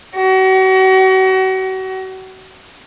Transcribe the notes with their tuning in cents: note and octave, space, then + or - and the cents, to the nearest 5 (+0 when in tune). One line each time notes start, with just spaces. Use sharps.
F#4 +35